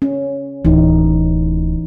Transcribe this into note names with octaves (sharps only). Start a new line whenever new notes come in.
C#4
D1 E3 D#4